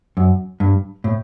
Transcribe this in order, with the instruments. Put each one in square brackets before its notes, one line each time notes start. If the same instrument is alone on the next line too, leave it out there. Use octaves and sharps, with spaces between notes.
[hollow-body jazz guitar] F#2
G2
A2